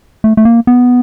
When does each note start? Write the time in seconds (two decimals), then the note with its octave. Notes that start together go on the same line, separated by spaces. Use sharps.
0.24 A3
0.37 A3
0.45 A#3
0.67 B3